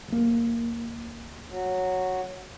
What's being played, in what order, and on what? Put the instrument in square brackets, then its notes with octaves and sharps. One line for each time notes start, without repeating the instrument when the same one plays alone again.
[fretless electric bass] D1 A#3
[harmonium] F#3